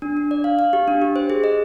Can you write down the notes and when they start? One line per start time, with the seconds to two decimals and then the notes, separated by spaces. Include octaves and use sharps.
0.02 D4
0.17 D4
0.31 D5
0.44 F5
0.59 F5
0.73 G4
0.88 D4
1.02 G4
1.16 C5
1.30 G#4
1.44 D#5